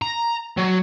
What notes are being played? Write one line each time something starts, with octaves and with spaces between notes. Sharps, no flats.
A#5
F#3